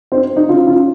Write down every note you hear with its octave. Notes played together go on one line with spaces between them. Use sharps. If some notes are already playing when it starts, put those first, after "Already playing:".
C4 D#4
D#4
C#4 F4
C#4 F4